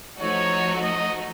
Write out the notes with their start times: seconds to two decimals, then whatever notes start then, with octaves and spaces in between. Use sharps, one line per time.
0.19 F3 A3 D#4 F#4 C#5
0.83 D#5